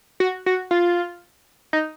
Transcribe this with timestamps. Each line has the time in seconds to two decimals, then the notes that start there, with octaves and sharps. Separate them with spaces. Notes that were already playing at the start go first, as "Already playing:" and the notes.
0.20 F#4
0.46 F#4
0.71 F4
1.73 D#4